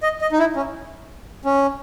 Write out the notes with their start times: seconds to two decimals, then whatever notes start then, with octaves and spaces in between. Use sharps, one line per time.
0.03 D#5
0.21 D#5
0.32 D#4
0.39 E4
0.56 C#4
1.45 C#4